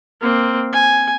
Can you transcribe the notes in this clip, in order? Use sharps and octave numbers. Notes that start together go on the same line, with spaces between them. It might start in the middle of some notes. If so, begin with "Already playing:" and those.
A#3 C4
G#5